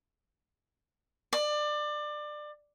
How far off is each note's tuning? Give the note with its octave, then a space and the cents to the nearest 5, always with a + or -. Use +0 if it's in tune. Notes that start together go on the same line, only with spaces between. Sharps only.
D5 +25